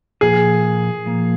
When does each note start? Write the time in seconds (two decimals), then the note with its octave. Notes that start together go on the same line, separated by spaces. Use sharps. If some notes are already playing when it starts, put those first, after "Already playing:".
0.21 A#2 F3 A#3 G#4
1.05 A#2 F3 A#3